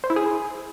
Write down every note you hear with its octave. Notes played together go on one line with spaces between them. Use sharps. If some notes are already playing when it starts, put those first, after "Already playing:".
C5
E4
G#4